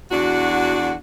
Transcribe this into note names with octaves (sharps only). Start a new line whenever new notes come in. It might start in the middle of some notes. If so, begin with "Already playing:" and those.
E2 D4 F#4